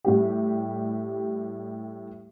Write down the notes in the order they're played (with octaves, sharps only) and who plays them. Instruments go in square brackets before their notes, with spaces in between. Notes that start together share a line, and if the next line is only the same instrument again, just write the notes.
[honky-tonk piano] A2 G3 G4